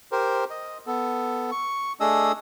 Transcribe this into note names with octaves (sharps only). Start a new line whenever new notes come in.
G4 A#4 C5
D#5
B3 A4
C#6
A3 D4 G#4 D#5 D#6 E6